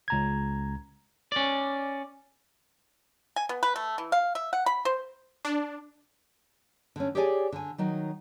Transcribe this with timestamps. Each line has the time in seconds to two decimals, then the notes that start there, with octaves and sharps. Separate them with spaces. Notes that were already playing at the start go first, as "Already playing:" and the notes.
0.08 C#2 A#5 G#6
1.32 C#4 D5
3.36 G#5
3.49 B3
3.63 B4
3.76 A3
3.98 E3
4.12 F5
4.35 E5
4.53 F#5
4.66 B5
4.85 C5
5.45 D4
6.96 D3 C#4
7.15 G4 G#4 C#5 D5 E5 G#5
7.52 D3 G#5
7.78 D#3 F#3 D#4